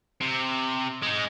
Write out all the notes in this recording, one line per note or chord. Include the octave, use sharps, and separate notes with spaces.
C3
G#3 D#4